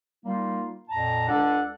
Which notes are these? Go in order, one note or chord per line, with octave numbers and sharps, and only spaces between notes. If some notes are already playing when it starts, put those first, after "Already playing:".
G3 A#3 D#4 F4
F2 A#2 A5 A#5
C#2 D4 A4 F#5